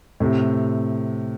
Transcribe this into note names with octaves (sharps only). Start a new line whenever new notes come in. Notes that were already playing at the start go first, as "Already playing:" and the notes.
A2 C3